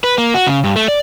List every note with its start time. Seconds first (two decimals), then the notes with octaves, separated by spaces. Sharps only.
0.04 B4
0.18 A#3
0.34 F#4
0.47 C#3
0.64 G2
0.76 A3
0.88 D5